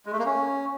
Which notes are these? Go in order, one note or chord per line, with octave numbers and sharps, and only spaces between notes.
G#3
A3
A#3
C#4